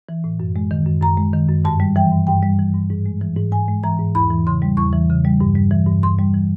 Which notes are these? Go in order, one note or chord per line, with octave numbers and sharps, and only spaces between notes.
E3
A2
F#2
G#3
D#3
F#2
F#2 A#5
G#3
D#3
F#2
G2 A5
G3
E3 G5
G2
G2 G5
G3
E3
G2
G#2
G#3
E3
G#2
G#2 G#5
G#3
E3 A#5
G#2
E2 B5
E3
C#3 C6
G3
E2 C#6
E3
C#3
G3
G2
G3
E3
G2
G2 C6
G3
E3